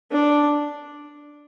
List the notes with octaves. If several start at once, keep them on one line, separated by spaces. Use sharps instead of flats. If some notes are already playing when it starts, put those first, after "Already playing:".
D4